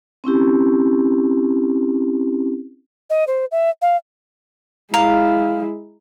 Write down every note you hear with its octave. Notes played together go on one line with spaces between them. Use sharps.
C4 C#4 E4 G4
D#5
C5
E5
F5
G#3 E4 F5 A#5